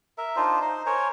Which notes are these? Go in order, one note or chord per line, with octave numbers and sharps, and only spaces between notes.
A#4 E5
D4 D#4 F4 C5
D#4 C5
A#4 C5 C#5 G#5